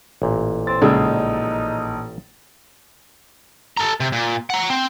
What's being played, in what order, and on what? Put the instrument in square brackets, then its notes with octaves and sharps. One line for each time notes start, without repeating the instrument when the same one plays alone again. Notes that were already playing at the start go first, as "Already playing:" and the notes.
[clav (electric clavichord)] A1 A#2
[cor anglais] C4 [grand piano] A6
[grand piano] A#1 D5 E6 [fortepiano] C#3 G#3 [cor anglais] D#4
[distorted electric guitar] A4 A#5
C3
A#2
F#5 A#5
C4